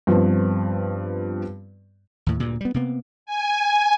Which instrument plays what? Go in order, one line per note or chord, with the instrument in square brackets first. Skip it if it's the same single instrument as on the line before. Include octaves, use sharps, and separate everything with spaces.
[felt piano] G2 F3 B3 C4
[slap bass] D#2 A2
D2 G2 A#2
G3 B3
C3 A#3 B3
[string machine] G#5